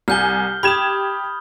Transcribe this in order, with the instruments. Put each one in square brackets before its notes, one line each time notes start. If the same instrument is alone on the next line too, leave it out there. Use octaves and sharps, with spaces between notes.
[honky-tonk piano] C2 G#5 [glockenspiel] F6 G6 G7
[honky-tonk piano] G4 G#6 E7 [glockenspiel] B5 D#6